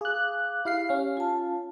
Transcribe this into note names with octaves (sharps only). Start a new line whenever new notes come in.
G#4 F5 D6 F#6
E4 G4 F5 C7
C#4 F5
F4 A5